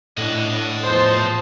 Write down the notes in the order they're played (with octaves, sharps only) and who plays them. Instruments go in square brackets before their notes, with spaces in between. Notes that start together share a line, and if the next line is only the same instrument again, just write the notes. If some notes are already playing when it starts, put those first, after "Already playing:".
[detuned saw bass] A2 [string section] D4 [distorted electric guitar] D#5 F#5
[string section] E2 F3 A5 [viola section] C5